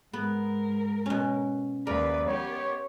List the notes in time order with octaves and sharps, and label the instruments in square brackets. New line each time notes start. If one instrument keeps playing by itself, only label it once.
[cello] G#2 A#4 [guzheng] B3
[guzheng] B2 C#4
[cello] D#2 B4 [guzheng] A#4 [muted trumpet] D5
[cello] B3 G4 [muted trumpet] C#5